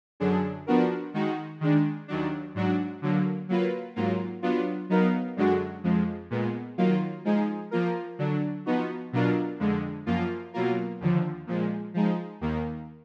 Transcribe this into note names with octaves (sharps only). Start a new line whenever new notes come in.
F#2 D3 F#3 D4 G#4
F3 B3 D4 F#4 A#4
D#3 G#3 D#4 F#4
D#3 G#3 D4
D#2 D#3 F#3 D4
G#2 F#3 D4 F#4
D3 F#3 A#3
F#3 A#3 F4 B4
G#2 F#3 A#3 F4
F#3 B3 D4 F4
F#3 B3 D#4 A#4 F5
F#2 D3 G#3 D4 F#4
F2 F3 G#3
A#2 G#3 B3
D#3 F#3 A#3 F4
F3 G#3 D#4 G#4
F3 A#3 F4 A#4
D3 F#3 D4
F3 B3 D#4 F#4
B2 F#3 D4 F4 A#4
F2 D3 G#3
F#2 F3 A#3 F4
B2 F#3 A#3 F4 A#4
D#2 D3 F3
A#2 F3 G#3
F3 G#3 D#4
D#2 D#3 A#3